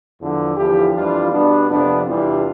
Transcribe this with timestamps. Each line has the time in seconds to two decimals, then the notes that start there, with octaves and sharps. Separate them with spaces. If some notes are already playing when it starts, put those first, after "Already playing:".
0.20 E2 D3 F3
0.57 E2 D3 F3 E4 G4
0.95 F2 E3 G3 D4 F4
1.32 B2 G3 B3 D4
1.70 F2 C3 F3 B3 D4
2.07 E2 C3 E3 G3 D4 F4